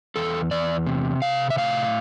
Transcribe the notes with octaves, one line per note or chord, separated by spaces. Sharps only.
E2 A4
E2 D5
C3
C3 F5
E5
A2 F5